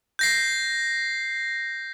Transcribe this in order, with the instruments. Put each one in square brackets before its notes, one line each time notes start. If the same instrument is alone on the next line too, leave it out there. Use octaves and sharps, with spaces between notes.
[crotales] G6 A#6 C7